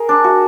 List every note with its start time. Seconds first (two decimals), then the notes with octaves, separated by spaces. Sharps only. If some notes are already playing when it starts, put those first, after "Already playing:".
Already playing: G#4 A#4
0.09 D4
0.24 F#4